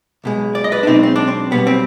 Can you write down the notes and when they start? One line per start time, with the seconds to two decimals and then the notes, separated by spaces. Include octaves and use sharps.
0.24 B1 B2 G#3
0.55 D5
0.64 D#5
0.72 B4 D5
0.83 D4
0.87 B1 B2 G#3 C4 D#4
1.03 C4
1.16 D4
1.28 C4
1.51 B1 B2 G3 B3
1.67 C4